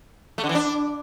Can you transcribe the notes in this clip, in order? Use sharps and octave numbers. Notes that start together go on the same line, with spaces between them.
A3
D3
E3
D4